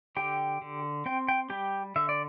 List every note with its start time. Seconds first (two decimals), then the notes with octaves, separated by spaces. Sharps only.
0.16 D3 G4 G5
0.62 D3
1.06 C4 G5
1.28 G5
1.50 G3 G4 G5
1.96 D3 E5
2.09 D5